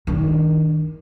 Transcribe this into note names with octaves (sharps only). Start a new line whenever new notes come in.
D#3 D4